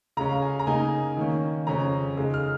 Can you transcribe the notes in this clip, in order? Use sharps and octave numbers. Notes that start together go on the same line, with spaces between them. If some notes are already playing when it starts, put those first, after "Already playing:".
C#3 G#3 C#4 A#5
F5
G#5
A#5
C#3 A#3 D#4 G#5
D#3 A#3 C#4
F2 C#3 G#3 C#4 A#5
C#3 G#3 D#4
F6